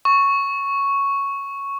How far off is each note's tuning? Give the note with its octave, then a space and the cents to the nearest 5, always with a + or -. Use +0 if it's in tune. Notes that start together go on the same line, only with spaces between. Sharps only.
C#6 +0